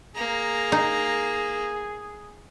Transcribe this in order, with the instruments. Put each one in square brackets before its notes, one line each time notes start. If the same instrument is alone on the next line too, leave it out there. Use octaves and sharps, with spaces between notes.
[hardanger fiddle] A#3 A#5 [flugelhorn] G#4
[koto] D#4